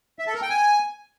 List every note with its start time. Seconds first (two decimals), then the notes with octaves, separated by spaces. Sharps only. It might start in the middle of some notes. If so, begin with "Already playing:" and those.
0.19 E5
0.27 A4
0.34 A#4
0.42 G5
0.50 G#5